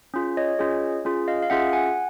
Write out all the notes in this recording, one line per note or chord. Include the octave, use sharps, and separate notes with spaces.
C#4 F4 G#4
C#5 D#5
C#4 F4 G#4
C#4 F4 G#4
D#5 F5
F5
C#4 F4 G#4 E5 F#5
F#5 G#5